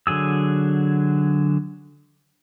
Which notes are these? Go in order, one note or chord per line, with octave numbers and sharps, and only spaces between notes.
D3 F#3 G#4 E6